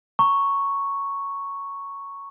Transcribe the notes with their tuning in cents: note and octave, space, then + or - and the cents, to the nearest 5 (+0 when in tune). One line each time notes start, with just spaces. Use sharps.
A#5 -15 C#6 +0